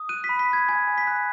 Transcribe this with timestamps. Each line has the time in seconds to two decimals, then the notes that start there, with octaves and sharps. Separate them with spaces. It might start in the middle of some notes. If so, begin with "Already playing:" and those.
Already playing: D#6
0.09 F#6 D#7
0.24 B6
0.29 B5
0.39 B6
0.48 B5 G#6
0.69 G#5 G#6
0.87 G#5
0.98 B6
1.07 F#6